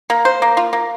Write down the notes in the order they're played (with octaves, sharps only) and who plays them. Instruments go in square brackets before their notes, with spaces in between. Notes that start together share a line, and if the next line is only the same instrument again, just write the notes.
[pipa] A#3
C5
A#3
F4
A#3